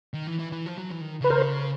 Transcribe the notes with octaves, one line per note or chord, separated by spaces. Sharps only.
D#3
E3
E3
E3
F3
F#3
E3
D#3
C#3 B4
A#4 C5